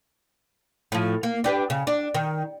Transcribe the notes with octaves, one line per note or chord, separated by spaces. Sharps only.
A2 F3
A#3
D4 G4 B4
C#3
D4
D#3